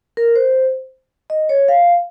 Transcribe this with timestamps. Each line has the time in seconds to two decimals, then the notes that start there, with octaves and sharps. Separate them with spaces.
0.17 A#4
0.36 C5
1.30 D#5
1.49 C#5
1.68 F5